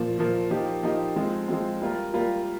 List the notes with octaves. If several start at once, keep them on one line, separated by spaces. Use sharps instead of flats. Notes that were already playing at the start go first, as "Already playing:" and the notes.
Already playing: A#2 F3 A#3
A#2 F3 A#3
F3 A#3 D#4 G4
F3 A#3 D#4 G4
F3 G#3 C4
F3 G#3 C4
G3 A#3 F4 A#4
G3 A#3 F4 A#4